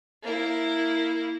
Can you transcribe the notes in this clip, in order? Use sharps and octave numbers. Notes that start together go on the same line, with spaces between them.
A#3 E4